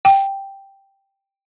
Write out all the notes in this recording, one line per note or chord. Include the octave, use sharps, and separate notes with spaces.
G5